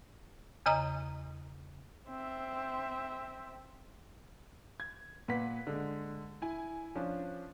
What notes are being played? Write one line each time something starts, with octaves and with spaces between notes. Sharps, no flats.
E2 C#3 D#5 A#5 D#6
C4 E5
G#6
A#2 B4 F#5 B6
D3 G#3
E4 G#5
F3 C#4 D4